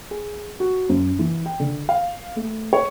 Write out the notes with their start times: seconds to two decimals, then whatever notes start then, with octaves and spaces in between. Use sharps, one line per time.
0.11 G#4
0.60 F#4
0.89 F#2
1.19 E3
1.46 G5
1.60 D3
1.89 F5
2.36 A3
2.73 C#5